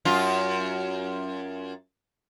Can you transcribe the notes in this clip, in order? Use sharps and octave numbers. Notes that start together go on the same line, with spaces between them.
F#2 F4